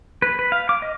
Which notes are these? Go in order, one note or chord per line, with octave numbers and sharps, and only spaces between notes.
B4
B4
F5
D6
D#5